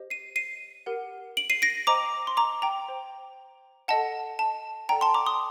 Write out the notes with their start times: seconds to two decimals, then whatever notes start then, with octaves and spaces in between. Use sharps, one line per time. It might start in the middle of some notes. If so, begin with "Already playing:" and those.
Already playing: G4 C5 D#5
0.10 C7 D#7
0.36 C7 D#7
0.86 G4 A#4 F#5
1.37 D7 F#7
1.50 C7 D#7
1.62 A#6 D7
1.87 C5 D#5 G5 A#5 D6
2.27 C6
2.37 A#5 D6
2.62 G5 A#5
2.89 C5 G5
3.88 A4 D#5 F#5 A5
4.39 A5
4.89 A4 D5 F#5 G5 A#5
5.01 A5 C6
5.14 A#5 D6
5.26 C6 D#6